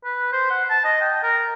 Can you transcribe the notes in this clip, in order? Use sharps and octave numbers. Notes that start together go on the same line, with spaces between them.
B4
C5
F#5
A5
D#5
G5
A#4